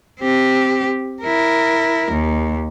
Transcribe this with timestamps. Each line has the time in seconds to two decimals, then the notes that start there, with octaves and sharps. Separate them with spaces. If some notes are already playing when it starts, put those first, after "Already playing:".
0.21 C4 G4
1.23 E4 A#4
2.12 D#2